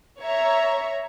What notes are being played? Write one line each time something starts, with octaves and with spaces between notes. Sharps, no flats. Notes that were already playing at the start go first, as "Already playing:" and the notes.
C#5 E5 A#5